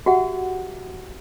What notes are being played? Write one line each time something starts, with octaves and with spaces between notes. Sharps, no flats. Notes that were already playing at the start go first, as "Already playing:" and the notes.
F#4 G4 E5 F#5